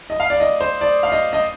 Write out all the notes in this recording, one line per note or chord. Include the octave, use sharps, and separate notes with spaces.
D#5
F5
D5
D#5
C5
D5
F5
D#5
D#5